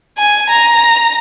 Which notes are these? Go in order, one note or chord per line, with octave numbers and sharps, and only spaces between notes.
G#5
A#5